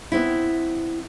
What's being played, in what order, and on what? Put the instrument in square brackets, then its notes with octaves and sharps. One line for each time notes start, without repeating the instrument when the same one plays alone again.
[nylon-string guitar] B3 C4 E4